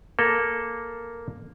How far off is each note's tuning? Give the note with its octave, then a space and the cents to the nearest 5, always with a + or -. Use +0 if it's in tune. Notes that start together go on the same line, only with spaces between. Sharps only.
A#3 +0 A4 +0